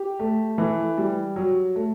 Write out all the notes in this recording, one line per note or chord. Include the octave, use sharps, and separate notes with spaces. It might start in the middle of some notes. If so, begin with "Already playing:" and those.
Already playing: G4
A3
E3
G3
F#3
A3